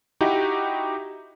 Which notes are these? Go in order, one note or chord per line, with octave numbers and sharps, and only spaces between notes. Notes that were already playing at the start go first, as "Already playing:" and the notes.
D#4 E4 F#4 G4